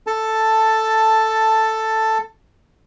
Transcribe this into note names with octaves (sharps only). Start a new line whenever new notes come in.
A4 A5